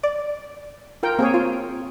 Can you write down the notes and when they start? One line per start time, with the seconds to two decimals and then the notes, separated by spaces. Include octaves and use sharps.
0.03 D5
1.03 F4 A#4 G5
1.19 A#3 C4 G#4 C#5
1.34 F4